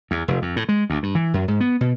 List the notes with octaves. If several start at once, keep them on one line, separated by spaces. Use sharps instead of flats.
E2
F1
F2
A2
G#3
D2
G2
E3
F#2
G#2
B3
B2